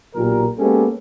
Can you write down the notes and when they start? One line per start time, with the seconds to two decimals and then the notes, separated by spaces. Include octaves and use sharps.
0.15 B1 A#2 G4 A#4
0.58 G#3 A#3 B3 C#4 G4 A4